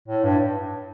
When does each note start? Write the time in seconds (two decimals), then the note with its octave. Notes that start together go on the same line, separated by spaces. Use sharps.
0.08 A2
0.23 G2